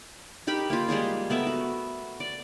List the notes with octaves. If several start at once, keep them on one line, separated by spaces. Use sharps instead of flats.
D#4 G4 A#4 B5
A#3 F4
G3 G#3 G4 G#4
A3 B3 A#4 E5
F#4
D5